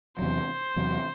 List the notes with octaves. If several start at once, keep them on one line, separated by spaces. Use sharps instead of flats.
E2 C3 F#3 C5
E2 C3 F#3